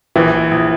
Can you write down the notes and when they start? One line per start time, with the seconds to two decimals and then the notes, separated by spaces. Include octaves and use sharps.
0.16 A#1 E3
0.51 A#1